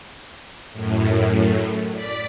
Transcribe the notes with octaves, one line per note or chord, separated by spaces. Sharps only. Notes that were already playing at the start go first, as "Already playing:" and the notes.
F#2 A2
D5 B6